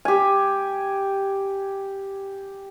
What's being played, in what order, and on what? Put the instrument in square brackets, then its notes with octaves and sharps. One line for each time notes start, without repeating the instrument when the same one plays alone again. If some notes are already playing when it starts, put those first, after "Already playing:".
[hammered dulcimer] G4 G#5